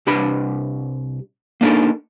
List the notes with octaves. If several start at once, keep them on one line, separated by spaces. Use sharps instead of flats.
C2 D4 G4 B4 B5
A#3 B3 D4 D#4 A4 A#4